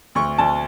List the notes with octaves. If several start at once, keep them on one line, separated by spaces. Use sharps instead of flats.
D2 C#6
D2 A5